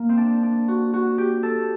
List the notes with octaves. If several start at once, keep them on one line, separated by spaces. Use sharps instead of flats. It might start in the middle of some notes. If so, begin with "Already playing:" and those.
Already playing: A#3
C4
D4
D4
F#4
F#4
G4
A4